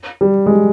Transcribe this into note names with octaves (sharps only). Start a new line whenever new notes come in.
G3
G#3
G3